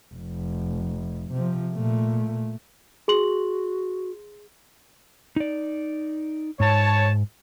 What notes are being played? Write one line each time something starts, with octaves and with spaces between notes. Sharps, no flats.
F1
C3 F3
A#2 A3
F#4 G#4 C6 F#7
D#4 D5
G#2 C#5 A5